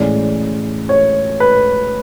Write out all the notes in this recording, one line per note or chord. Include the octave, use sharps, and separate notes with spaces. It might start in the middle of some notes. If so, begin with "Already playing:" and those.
Already playing: A2 E3 G#3 C#4 D5
C#5
B4